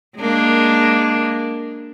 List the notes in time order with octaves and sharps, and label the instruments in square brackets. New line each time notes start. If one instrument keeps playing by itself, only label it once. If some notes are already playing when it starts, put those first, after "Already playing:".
[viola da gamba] G#3 A#3 D4